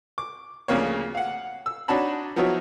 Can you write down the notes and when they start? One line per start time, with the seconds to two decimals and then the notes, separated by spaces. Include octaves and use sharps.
0.18 D6
0.68 D2 C#3 F3 A#3 C#5
1.15 F5 F#5
1.66 E6
1.88 D4 D#4 F#4 C#5 A5 B5
2.36 F3 F#3 B3 D#4 E4 C#5